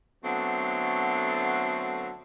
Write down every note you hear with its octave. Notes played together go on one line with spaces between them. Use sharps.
D3 F#3 A3 B3 C4